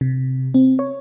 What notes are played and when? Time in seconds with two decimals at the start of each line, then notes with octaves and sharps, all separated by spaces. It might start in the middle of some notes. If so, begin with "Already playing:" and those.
0.01 C3
0.54 C4
0.79 C#5